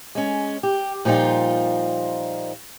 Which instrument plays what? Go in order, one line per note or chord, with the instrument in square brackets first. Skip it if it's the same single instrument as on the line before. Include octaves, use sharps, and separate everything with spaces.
[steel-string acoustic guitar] G#3 C#4
G4
A#2 F3 G3 D#4 F4